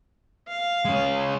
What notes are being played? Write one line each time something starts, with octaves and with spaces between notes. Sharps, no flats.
F5
G#3 C#4